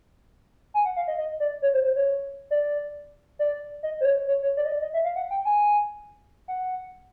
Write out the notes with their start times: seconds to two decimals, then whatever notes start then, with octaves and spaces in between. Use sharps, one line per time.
0.74 G#5
0.85 F#5
0.96 F5
1.08 D#5
1.18 D#5
1.40 D5
1.62 C#5
1.74 C5
1.84 C5
1.96 C#5
2.51 D5
3.39 D5
3.83 D#5
4.01 C5
4.05 C#5
4.28 C#5
4.43 C#5
4.57 D5
4.65 D#5
4.72 D5
4.82 D#5
4.94 E5
5.05 F5
5.16 F#5
5.31 G5
5.45 G#5
6.48 F#5